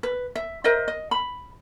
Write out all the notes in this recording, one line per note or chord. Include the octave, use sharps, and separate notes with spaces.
B4
E5
A#4 C5 D#5 E5
D#5
B5